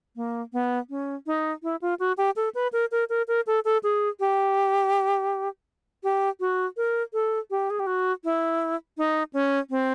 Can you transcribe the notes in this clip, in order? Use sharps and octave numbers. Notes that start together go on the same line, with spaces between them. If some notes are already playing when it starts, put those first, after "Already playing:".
A#3
B3
C#4
D#4
E4
F4
F#4
G4
A4
B4
A#4
A#4
A#4
A#4
A4
A4
G#4
G4
G4
F#4
A#4
A4
G4
G#4
G4
F#4
E4
D#4
C#4
C4